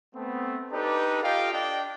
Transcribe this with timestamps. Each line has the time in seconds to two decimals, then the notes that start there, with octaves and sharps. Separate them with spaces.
0.15 A3 B3 C4
0.71 D4 D#4 G4 A4 B4 D5
1.23 F4 G4 A4 D#5 F5 G5
1.53 D4 D#5 G5